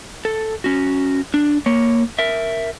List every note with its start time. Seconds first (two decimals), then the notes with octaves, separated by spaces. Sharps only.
0.25 A4
0.64 C#4 F#4
1.34 D4
1.66 A#3 C#5
2.19 A#4 E5